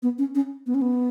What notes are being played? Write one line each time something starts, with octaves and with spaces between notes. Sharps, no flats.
B3
C#4
C#4
B3
C#4
B3